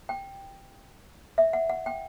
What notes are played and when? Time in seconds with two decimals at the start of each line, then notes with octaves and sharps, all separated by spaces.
0.09 G5
1.38 E5
1.53 F#5
1.70 F#5
1.86 G5